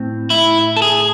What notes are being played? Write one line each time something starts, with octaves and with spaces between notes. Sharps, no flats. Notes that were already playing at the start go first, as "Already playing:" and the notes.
Already playing: A2 C4
E4
A4
G#4